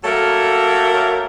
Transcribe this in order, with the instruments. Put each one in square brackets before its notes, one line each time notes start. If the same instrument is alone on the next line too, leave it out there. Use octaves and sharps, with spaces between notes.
[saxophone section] F#3 A3 A#3 A4 A#4 C#5